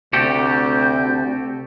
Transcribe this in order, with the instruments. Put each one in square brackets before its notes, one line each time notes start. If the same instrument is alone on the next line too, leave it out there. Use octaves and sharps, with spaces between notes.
[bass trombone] D2 [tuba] C3 [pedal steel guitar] F#4 G4 A4 [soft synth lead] G6